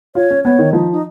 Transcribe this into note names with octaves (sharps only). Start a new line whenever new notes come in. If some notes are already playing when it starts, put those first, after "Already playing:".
F4 C#5
C#4
B3 C#5
D#3
F3 D#4
D#4